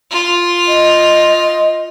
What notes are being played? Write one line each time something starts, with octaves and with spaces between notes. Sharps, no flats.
F4
D#5